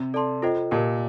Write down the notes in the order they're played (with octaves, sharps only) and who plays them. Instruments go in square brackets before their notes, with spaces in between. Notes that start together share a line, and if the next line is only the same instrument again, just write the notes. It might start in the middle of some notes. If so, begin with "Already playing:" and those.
Already playing: [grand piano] C3
[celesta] A4 D5 A5 C6
F4 A4 C5 D#5 G5
[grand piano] A#2 [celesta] G4 A#4 D#5 A5